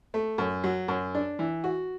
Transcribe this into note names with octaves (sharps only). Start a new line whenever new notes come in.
A3
F#2
F#3
F#2
D4
E3
F#4